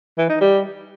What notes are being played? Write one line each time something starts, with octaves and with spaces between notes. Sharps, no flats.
E3
D#4
G3